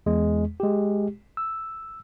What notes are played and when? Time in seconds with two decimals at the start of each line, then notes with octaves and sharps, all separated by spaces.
0.06 E2 G#3
0.60 G#3 G4
1.37 E6